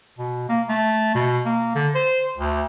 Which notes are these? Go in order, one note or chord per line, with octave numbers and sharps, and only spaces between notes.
B2
A#3
A3
B2
A#3
D3
C5
D2